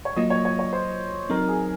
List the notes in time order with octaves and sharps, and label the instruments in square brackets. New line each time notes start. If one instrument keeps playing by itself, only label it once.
[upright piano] C#5
[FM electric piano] F#3 A#3 F4 [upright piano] D#5
[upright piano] C#5
C#5
C#5
C5
[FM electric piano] F#3 C4 D#4 [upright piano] A#4
[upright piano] G#4